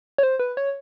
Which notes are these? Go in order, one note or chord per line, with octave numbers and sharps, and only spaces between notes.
C#5
C5
B4
C#5